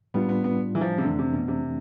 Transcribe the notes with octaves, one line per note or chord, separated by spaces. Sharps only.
A2 G3 B3 D4 F4
B3
B3
E3
F3
C3
F2 D3 E3 A3 D4
C3
B2
C3